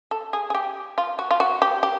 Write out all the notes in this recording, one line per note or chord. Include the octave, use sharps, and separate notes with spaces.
A4
G#4
G#4
G4
F4
F#4
F4
F#4
G4
G4